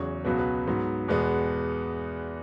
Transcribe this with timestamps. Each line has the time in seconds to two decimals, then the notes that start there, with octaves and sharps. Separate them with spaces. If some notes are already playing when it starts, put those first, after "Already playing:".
Already playing: E2 C#3 F#3 C#5
0.25 C#2 B2 F#3 B3 B4
0.39 B4
0.67 G#2 F#3 B3
1.08 E2 B2 G#3 B3